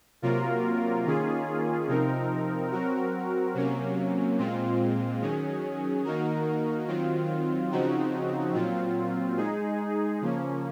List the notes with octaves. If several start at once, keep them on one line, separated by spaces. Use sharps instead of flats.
C3 F#3 A#3 F4 A#4
D#3 A#3 C#4 F4 G#4
C3 F3 C4 D#4 A#4
F#3 C4 F#4 A#4
C3 F#3 A#3 C#4
A#2 G#3 C4 F4
D#3 F#3 C#4 G#4
D#3 A#3 D#4 F#4 A#4
D#3 F#3 C4 F4
C#3 F3 C4 D#4 F#4
A#2 F#3 C4 F4
G#3 D#4 G#4
C#3 F3 A#3 C#4